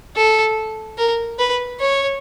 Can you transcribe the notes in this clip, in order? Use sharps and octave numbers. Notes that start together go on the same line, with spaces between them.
A4
A#4
B4
C#5